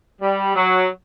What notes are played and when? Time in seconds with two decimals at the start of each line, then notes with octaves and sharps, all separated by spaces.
0.22 G3
0.56 F#3